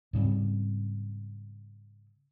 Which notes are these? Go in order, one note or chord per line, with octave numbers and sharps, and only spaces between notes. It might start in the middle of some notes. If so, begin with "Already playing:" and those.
G#2 C#3 G3 C4